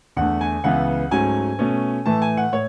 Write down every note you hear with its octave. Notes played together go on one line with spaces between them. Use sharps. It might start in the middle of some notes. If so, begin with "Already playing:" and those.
E2 D3 A3 F#5
G#5
C#2 C#3 E3 B3 F#5
G#2 F#3 A3 C#4 G#5
B2 A3 C#4
A2 E3 A3 A5
G#5
F#5
A2 C#5